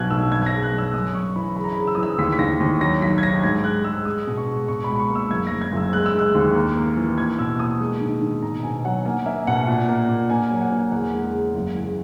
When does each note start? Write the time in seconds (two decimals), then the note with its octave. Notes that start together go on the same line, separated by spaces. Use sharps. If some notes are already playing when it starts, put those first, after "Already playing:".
Already playing: B1 B2 F#6 G#6
0.10 B1 E6
0.32 F#2 G#6
0.42 G#6
0.46 A#6
0.52 C#3
0.63 F#6
0.73 F#2
0.78 E6
0.94 F#2 D#6
1.14 F#2 C#6
1.36 E3 B5
1.56 C#3 B5
1.64 A#5
1.73 C#3 B5
1.87 E6
1.95 D#6
1.98 E3
2.03 E6
2.18 D#2 B6
2.32 B6
2.39 D#2 A#6
2.60 D#2
2.81 F#3 A#6
3.02 B1 B6
3.18 G#6
3.23 F#3 A#6
3.43 G#2 G#6
3.64 G#3 F#6
3.84 G#3 E6
4.05 G#3 D#6
4.27 B2
4.37 C#6
4.47 G#3
4.68 B2 C#6
4.84 B5
4.89 C#2
4.95 B5
4.99 C#6
5.10 A#3
5.15 E6
5.30 F#1 G#6
5.47 F#1 A#6
5.61 G#6
5.72 F#1
5.77 E6
5.93 G#3 F#6
6.06 E6
6.14 G#3 F#6
6.35 D#2
6.55 A#3
6.76 A#3
6.97 E3
7.18 A#3 G#6
7.39 B2 E6
7.59 A#3 D#6
7.80 G#3
8.01 D#3
8.21 D#3
8.42 B2 A#5
8.63 B2 G#5
8.84 F#3 F#5
9.05 A#3 G#5
9.26 A#3 E5
9.47 B2 F#5
9.67 A#2
9.89 A#3
10.09 A#2
10.30 A#3 G#5
10.51 F#3
10.61 F#5
10.72 A#3
10.92 E2 F#5
11.13 G#3
11.34 C#3
11.55 F#1
11.75 E2